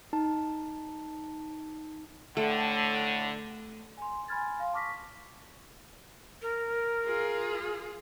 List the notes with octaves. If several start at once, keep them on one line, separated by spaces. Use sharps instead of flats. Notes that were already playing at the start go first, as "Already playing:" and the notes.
D#4 A5
A2 D3 A3
G#5 C6
G#5 B5 C6 F6 G#6 A6
F5 C6
A5 C#6 D6 F6 A#6 B6
A#4
F4 G#4